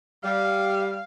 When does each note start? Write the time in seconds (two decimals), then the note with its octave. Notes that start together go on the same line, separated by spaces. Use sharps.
0.24 G3 F5